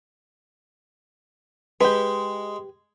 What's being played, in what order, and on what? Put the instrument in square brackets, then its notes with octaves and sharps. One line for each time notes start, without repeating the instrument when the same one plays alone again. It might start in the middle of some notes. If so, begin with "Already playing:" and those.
[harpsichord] G#3 [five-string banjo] G4 B4